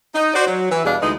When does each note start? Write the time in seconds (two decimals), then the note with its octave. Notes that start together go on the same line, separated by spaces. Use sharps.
0.14 D#4
0.34 F#4 C5 D5
0.47 F#3
0.70 E3
0.85 E2 B2 G3 D4 G#4 F5
1.01 D2 E3 G#3 D#4